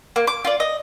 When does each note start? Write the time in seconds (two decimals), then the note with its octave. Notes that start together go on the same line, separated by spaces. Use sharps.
0.16 A#3
0.27 D6
0.45 F4 D5
0.60 D#5